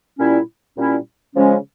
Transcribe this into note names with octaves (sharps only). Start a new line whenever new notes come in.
A#2 G3 C#4 E4
A#2 G3 C#4 E4
C#3 F3 G#3 C#4